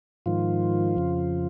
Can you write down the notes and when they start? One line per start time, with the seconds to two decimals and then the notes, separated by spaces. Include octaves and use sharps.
0.26 G#2 D#3 F3 F4
0.97 F2 C#3